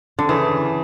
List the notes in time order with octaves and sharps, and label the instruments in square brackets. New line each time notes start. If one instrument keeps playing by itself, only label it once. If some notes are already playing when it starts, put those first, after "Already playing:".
[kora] D3
[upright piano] C#3 [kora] E3